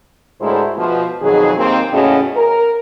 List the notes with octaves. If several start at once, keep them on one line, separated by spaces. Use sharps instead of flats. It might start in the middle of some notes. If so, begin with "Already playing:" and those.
D2 A2 G#3 E4 A#4 C5
B2 F3
F2 B2 D#3 F#3 G#4
D#2 D#3 A#3 C4
E2 A2 C#3 C#4 F#4 D#5
A#4